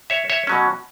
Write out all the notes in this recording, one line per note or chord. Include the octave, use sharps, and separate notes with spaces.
C#5 E5
C#5 E5
B2 F#3 C#4